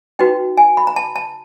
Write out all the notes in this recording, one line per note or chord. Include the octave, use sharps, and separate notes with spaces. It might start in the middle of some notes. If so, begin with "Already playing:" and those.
D#4 F#4 B4 G5
G#5
B5
A#5
A5
A5